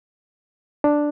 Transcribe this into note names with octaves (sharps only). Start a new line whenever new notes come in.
D4